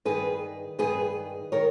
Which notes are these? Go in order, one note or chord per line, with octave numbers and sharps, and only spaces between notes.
G2 D#3 G#4 B4
G2 D#3 G#4 B4
D#3 A#4 C#5